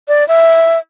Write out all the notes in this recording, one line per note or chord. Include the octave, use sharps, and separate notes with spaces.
D5
E5